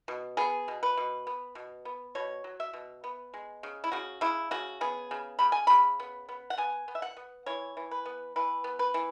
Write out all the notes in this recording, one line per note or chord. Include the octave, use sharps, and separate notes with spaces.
B2
B3 G#4
B2
B4
B2
B3
B2
B3
B2 C#5
F#3
E5
B2
B3
G#3
C#3
E4
C#3 F#4
C#3 E4
C#3 F#4
B3 G#4
C#3
C#3 B5
G#5
C#3 B5
B3
B3
F#5
B3 G#5
B3
E5
F#5
B3
E3 C#5
E3
B4
B3
E3 B4
B3
B4
E3